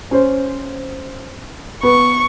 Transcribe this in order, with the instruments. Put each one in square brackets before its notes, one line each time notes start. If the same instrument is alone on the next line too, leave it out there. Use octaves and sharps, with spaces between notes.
[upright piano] C#4 C5
[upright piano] B3 [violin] C#6